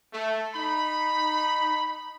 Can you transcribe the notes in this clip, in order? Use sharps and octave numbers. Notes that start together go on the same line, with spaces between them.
A3
D#4 B5